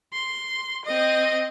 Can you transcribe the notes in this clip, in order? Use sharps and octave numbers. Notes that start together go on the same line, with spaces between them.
C6
C4 D#5